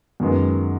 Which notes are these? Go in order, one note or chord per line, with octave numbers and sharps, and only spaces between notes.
F#2 D#3 G#3 B3